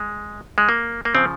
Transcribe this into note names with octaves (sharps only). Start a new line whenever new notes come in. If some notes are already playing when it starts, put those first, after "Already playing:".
Already playing: G#3
G#3
A#3
A#3
C#3 F3 C4